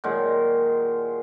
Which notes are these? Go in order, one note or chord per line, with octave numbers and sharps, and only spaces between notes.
A#2 D#3 F#3 G#3